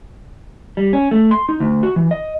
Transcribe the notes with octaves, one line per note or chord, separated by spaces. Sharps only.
G3
C#4
A3
C6
D#4
D2
F#4
E3
D#5